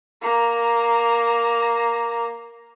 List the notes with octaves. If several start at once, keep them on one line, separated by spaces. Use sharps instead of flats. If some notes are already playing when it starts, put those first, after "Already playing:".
A#3 A#5